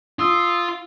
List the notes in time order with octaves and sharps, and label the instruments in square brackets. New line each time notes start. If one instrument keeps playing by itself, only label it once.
[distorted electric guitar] F4 [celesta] D#6 E6